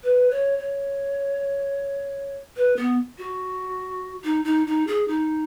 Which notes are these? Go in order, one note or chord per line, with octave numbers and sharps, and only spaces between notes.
B4
C#5
C#5
B4
B3
F#4
D#4
D#4
D#4
G#4
D#4